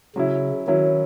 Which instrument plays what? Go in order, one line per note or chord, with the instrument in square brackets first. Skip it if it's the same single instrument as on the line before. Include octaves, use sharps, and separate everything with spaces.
[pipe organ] C#3 [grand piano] F#3 C#4 E4
[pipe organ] D#3 [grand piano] F#3 C#4 E4